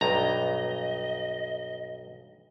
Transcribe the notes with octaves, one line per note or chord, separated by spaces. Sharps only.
B1 G2 D#5 A#5